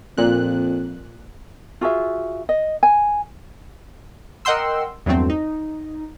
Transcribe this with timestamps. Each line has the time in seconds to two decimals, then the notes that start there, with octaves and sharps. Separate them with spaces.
0.18 F2 A#2 F#6
1.81 F4 F#4 G#4 E5
2.49 D#5
2.83 G#5
4.45 A#4 D#5 F#5 G5 C6 E6
5.06 E2 G2 F#3 A3 C4
5.30 D#4